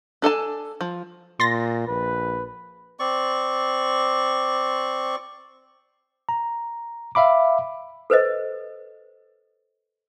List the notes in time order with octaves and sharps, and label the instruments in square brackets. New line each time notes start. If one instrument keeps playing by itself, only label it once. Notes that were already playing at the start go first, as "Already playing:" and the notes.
[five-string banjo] D4 A4 G#5 A5
F3
[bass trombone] A#2 [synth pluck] C6 A6 A#6
[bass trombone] A#1 [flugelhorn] B4
[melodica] C4 D5 C#6
[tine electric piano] A#5
E5 F5 B5 D6
[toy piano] A4 B4 C5 D#5